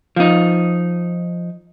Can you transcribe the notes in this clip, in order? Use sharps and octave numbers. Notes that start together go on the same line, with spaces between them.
F3 D#4